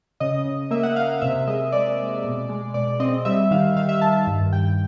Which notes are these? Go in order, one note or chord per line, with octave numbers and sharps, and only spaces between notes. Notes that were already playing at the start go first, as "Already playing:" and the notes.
C#3 D#5
C#3
A#3 E5
F#5
A#3 F5
F5
C3 E5
G#3 D#5
G#3 D5
G#3
B2
G#3
B2 D5
C4 D#5
G3 E5
D#3 F5
D#3 F5
E5
D#3 A5
G2
G2 G5